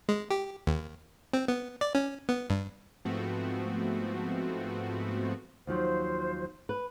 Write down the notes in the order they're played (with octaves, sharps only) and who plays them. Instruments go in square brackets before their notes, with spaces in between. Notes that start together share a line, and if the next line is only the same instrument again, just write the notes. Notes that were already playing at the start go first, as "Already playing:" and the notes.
[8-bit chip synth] G#3
G4
D#2
C4
B3
D5
C#4
B3
G2
[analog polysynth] G#2 F3 A3 B3 C4 F#4
[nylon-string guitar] D#2 F3 F#3 [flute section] C5
[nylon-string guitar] B4